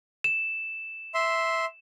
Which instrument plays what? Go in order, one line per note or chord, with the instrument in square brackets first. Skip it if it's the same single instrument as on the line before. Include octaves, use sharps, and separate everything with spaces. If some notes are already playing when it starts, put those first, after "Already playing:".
[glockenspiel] E7
[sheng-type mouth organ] E5 C6